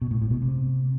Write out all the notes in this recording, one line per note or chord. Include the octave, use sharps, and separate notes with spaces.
B2
A2
A2
B2
C3